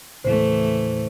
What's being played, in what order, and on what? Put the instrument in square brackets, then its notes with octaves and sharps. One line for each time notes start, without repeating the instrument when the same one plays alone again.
[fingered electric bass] D#2 A2 C#3 [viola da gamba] E3 A3 [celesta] C5